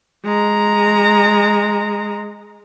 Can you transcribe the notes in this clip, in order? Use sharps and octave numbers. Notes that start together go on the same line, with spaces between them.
G#3 A#5